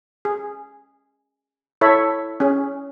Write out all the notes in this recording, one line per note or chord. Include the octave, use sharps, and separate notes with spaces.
G#4
E4 A4 C#5 E5 B5
C#4 G#4